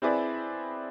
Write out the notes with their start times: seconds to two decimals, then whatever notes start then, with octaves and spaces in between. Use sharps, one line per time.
0.02 C4 E4 G#4 B4 D5